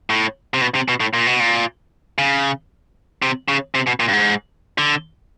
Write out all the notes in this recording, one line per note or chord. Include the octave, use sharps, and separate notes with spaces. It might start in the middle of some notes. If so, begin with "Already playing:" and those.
A2
C3
B2
C3
B2
A2
A#2
B2
A#2
C#3
C3
C#3
C3
B2
A#2
G2
G#2
D3